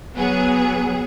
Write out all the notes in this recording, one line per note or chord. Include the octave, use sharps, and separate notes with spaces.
F#3 B3 G#4